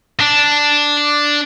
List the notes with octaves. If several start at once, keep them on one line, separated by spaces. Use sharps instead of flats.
D4